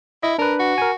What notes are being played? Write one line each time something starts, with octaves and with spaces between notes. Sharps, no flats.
E4 D#5
D4 A#4 B4
F#4
A#4 G#5